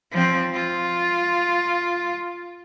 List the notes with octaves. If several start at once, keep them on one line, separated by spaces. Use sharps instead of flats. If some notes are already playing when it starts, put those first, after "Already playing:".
F3 C4
F4